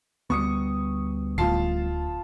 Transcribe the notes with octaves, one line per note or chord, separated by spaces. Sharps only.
D2 G3 A3 B3 C#6 D#6 C#7
D1 A2 F4 A5 C7